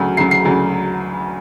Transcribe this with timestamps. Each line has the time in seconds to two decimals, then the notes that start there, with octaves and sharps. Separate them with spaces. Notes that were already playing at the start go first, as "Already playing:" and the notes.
Already playing: D2 C#3 F#3
0.17 D2 C#3 F#3 C7
0.31 C7
0.45 D2 C#3 F#3